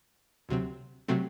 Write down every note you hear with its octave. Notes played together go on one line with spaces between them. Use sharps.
D2 C3 F#3 C4
C3 F#3 A3 C4